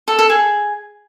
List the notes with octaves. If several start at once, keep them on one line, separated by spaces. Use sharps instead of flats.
A4
A4
G#4